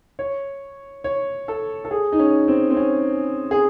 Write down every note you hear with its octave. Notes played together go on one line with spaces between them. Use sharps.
C#5
C#5
A4
A4
G#4
D#4
C#4
C4
C4
C#4
G#4